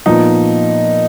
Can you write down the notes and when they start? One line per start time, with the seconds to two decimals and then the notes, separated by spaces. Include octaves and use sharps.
0.06 A#2 F3 B3 D#4